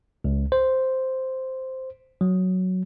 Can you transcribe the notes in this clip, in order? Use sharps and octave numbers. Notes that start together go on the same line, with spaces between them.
C#2
C5
F#3